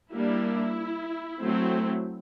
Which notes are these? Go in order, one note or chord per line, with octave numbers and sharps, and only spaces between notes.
G3 A#3 D4 E4
F#3 A3 C4